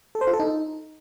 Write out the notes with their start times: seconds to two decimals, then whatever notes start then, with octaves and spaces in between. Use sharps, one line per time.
0.15 A4
0.21 C5
0.27 F4
0.33 A4
0.40 D#4